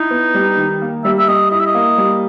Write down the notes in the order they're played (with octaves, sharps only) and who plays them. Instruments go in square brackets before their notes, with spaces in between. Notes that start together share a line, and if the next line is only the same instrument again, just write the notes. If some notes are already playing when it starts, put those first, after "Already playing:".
Already playing: [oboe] D#4 [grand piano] E4
[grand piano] B3
G3
D#3
A#3
[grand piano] G3 [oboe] E5
[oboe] E5
[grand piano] G3 [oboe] D#5
[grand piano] E4 [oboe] D#5
[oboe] E5
D#5
[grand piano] A#3
G3